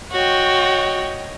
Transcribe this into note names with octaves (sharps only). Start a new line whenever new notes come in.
F#4 C#5 D#5 G5